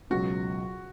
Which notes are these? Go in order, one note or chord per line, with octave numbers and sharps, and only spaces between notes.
C#2 B2 F#3 F#4